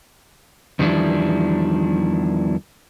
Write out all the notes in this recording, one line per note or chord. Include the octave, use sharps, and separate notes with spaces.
E2 D#3 F3 G3 D4 E4